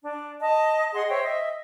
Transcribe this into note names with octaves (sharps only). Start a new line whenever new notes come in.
D4
D#5 A5
G#4 D#5 F#5 C6
C5 C#5 E5 G5
D#5 E5